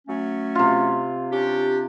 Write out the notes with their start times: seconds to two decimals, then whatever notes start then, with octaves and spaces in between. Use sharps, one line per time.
0.08 F#3 A3 C#4
0.55 C3 F4
1.32 C#4 D4 G4